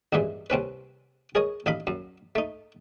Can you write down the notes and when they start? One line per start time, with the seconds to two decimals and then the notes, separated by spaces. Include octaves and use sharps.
0.13 A1 G2 A#2 E3 G#3
0.50 C2 C4 C#4 B4
1.35 G#4 A#4 C#5 D#5
1.66 A1 D#4 F5 B5
1.87 F#2
2.35 A3 D#4